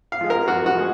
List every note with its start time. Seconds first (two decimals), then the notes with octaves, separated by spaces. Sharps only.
0.12 F5
0.21 F3 G#3
0.30 A#4
0.48 F#2 F#4
0.66 F#4
0.75 F3 G#3